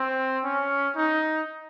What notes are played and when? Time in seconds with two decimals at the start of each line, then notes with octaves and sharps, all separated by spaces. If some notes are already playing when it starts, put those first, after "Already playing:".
Already playing: C4
0.44 C#4
0.96 D#4